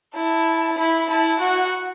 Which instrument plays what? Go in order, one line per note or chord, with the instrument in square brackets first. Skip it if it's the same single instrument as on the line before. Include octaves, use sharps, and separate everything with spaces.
[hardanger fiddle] E4 [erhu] A5
[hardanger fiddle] E4 [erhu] B5
[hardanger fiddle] E4 [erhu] A5
[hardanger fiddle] F#4 [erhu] F#5